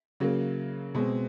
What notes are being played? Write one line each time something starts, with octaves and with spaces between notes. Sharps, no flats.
C#3 F#3 A#3
B2 G#3 C4